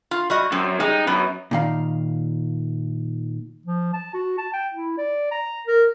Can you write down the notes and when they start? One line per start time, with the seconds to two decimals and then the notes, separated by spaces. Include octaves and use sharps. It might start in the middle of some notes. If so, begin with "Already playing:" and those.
0.11 F4
0.30 G3 F#4 D#5
0.52 F#2 C4
0.80 G3 G#3 D#4
1.07 F#2 B3
1.51 A#2 D#3 F5
3.66 F3
3.93 A5
4.14 F#4
4.38 A5
4.53 G5
4.74 E4
4.98 D5
5.31 A#5
5.67 A#4